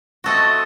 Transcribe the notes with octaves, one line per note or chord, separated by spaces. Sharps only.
A3 C4 F#4 A4 D#5